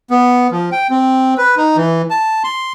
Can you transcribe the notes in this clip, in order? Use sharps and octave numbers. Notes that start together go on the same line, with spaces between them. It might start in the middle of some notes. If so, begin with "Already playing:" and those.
B3
F3
G5
C4
B4
D#4
E3
A5
C6